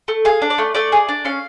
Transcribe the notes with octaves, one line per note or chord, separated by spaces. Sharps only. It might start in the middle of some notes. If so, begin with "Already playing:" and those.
A3
G#4 F5
D4
D5
A3
A3 D5
G#4
D4
C#4 F5